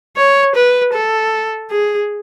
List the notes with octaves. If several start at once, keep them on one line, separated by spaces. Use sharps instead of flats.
C#5
B4
A4
G#4